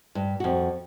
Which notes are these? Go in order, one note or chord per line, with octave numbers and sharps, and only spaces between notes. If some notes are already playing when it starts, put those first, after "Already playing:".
G2
F2 F#4